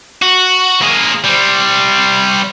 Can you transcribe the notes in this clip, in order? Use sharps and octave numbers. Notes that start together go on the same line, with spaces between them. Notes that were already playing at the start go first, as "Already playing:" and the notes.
F#4
A#3 G#4
G3 C4